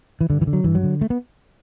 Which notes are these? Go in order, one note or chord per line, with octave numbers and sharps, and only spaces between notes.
E3
G2 D3
E3
D3
F#3
G2 E3
F#3
D3
A3
B3